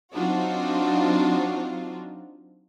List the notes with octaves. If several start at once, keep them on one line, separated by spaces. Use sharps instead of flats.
F#3 C4 D4 D#4 F4 F#4